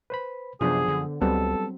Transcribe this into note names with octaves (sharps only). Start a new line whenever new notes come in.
B4 C5 B5
F#2 C3 F3 B3 D4 G#4 C5
D3
C#2 F#3 G3 B3 C4 A4